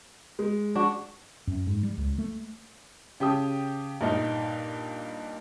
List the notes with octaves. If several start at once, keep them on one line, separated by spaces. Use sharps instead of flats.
G#3
D4 F#4
F#2
G#2
G3
C#2
A3
C#3 G4 A5 D#6
G2 A#2 D#4